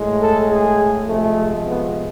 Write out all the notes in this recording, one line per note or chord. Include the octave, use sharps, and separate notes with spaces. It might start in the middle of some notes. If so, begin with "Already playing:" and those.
Already playing: A2 G#3
A4
G#4
C3 F3 G#3 A3
B3